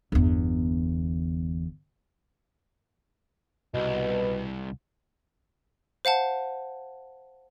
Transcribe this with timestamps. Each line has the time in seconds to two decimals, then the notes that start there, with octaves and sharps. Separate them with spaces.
0.12 G1 E2
3.75 C2 B2
6.05 C5 F5 F#5 A5